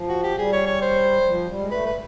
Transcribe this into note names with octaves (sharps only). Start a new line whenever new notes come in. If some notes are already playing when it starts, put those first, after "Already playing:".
Already playing: F3
F#4
G4
G3 G#4
C#5
C#5
C5
F3
G3
G#3
A3 B4
B4